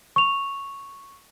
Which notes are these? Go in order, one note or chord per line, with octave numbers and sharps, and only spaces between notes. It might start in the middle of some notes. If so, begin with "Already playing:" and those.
C#6 F7